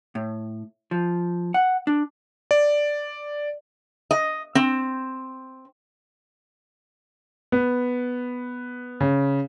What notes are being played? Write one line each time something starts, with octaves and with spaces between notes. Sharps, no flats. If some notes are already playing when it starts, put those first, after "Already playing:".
A2
F3
F#5
D4
D5
D#5
C4
B3
C#3